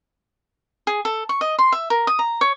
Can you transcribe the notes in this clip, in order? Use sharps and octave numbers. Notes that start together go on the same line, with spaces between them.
G#4
A4
C#6
D#5
C6
E5
A#4
D#6
A#5
C#5